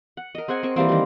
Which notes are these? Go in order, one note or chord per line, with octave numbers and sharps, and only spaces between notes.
F#5
A#4 D#5
C4 G#4 F#5 G#5
C4 C#6
E3 G3 A#3 C4
D#3 G3